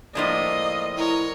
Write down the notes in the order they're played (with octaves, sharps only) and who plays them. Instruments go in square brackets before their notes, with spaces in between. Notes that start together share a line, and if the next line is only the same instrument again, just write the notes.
[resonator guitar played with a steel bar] A2 F3 D4 [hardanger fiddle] A#3 [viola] D#5
[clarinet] E4 [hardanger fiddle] A#4 C#5